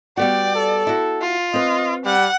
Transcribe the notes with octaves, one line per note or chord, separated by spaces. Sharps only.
G3 B3 F#4 D5 G5
A4
E4 F#4
F4
C4 B4 D#5
G3 F#5